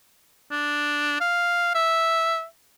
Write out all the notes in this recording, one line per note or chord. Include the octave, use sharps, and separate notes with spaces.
D4
F5
E5